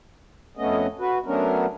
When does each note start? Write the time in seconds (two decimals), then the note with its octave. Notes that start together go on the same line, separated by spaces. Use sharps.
0.57 F2 A3 B3 C#4 D#5
0.99 F#4 B4
1.26 F#3 A3 B3 C#4 D4 A#4